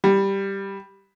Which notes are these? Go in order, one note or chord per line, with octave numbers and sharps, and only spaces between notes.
G3